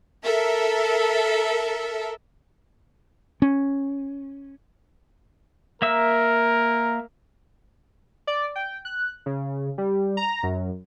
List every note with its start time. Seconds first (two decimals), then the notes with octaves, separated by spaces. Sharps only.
0.23 A4 A#4 E5
3.42 C#4
5.82 A#3 A#4 E5 E6
8.27 D5
8.56 G5
8.85 F#6
9.26 C#3
9.78 G3
10.17 A#5
10.43 F#2